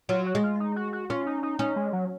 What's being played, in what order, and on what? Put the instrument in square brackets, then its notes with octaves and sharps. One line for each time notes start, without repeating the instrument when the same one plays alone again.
[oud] F#3 [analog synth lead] F4
[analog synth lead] F#4
[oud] G#3
[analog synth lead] F4
D#4
F#4
F#4
[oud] C#4 [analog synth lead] F4
[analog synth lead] D#4
D#4
[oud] C#4 [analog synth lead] D#4
[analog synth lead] G#3
F#3